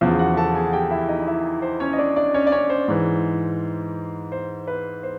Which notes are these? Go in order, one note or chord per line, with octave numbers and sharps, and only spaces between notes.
E2 C#3 F3 C5
F#4 F#5
A4 A5
G#4 G#5
F#5
G4 G5
E4 E5
D#4 D#5
D#5
E4 E5
C5
C#4 C#5
D#5
D4 D5
D4 D5
C#4 C#5
D5
C#4 C#5
C5
G#2 E3
C5
B4
C5